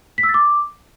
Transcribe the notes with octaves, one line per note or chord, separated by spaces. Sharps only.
B6
E6
A6
D6